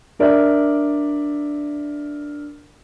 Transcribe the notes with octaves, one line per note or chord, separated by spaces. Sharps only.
D4 A#4 D5 E5